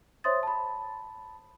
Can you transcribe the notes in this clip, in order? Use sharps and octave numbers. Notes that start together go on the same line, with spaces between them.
C5 C#5 E5 C6 D#6 A6
A5 B5